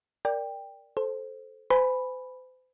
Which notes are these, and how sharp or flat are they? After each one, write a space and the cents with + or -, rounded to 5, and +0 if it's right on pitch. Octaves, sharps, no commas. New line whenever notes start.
A#4 +0 D5 +0 G5 +15
A4 -10 C5 +0
C5 -40 G#5 +0 B5 +0